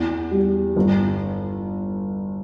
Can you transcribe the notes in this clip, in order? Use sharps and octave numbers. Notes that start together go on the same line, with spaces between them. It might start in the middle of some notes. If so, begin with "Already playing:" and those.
Already playing: E2
G3
G1